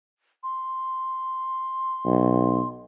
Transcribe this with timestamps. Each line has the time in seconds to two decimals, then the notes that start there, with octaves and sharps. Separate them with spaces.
0.43 C6
2.05 B1